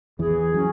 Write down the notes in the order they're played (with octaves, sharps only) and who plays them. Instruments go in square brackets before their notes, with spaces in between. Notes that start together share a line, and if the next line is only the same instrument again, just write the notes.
[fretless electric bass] E2 E3 [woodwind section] G#4
[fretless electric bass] F#3 [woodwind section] C#4